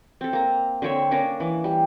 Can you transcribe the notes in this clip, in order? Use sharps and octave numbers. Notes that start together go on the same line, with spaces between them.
C4 A4
A#3 A#5
D3 C4 C#5 E5
A#3 C#4 D4 A#4
E3
G3